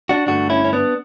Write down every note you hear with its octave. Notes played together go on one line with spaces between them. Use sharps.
D4 F#4
G2 D3 A3 D4 F#4
C#4 E4
C#4
B3 D4